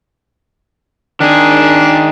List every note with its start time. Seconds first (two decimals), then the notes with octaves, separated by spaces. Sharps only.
1.20 D#3 D4 G#4